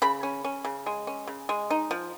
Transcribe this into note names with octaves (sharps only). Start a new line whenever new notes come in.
C#3 B5
C#4
C#4
C#3
G#3
C#4
C#3
G#3
D#4
F3